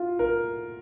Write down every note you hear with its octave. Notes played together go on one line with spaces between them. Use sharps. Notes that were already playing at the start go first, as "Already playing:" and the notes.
Already playing: F4
A#4